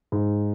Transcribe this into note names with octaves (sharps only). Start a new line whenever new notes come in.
G#2